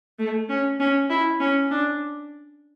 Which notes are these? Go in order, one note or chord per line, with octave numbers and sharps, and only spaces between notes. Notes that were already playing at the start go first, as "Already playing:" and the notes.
A3
C#4
C#4
E4
C#4
D4